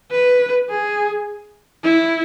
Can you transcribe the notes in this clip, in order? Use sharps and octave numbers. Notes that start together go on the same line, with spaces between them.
B4
G#4
E4